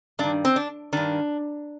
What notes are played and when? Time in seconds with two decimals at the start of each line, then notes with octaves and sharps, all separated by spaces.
0.19 G2 D#3 D4
0.45 C4
0.56 D4
0.93 G2 D#3 D4